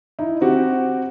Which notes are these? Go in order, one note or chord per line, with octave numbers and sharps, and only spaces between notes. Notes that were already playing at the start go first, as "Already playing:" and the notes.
D#4 E4
C4 F#4 G4